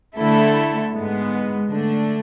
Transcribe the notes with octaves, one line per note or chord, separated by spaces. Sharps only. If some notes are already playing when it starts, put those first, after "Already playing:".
D3 A3 E4 A4
G#2 G#3 B3
D3 A3 D4